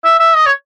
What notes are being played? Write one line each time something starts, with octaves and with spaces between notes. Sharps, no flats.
E5
E5
D#5
C#5